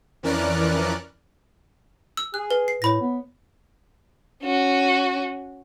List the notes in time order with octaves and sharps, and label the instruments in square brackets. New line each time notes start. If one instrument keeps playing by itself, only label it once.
[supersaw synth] F2 E3 C#4 A#4 D5 F#6
[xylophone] E6
[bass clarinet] G#4 [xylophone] F#6
[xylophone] B4
C7
[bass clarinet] A2 [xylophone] C#5 B5 A#6
[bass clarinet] B3
[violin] C#4 F#4